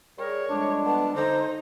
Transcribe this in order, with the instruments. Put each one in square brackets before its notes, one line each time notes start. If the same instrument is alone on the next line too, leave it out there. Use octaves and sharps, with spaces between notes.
[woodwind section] G3 G#4 A#4 [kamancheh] C#5
[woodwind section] F2 G3 G#3 [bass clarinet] D4
[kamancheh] B3 [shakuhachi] A5
[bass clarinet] D3 [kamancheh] D#4 A#5 [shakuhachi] C5